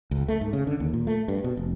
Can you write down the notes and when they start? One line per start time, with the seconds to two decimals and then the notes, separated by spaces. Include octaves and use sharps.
0.11 C#2
0.28 A3
0.41 G#2
0.53 C#3
0.67 D3
0.80 D#2
0.93 A#2
1.07 A3
1.28 G2
1.44 B2
1.57 F1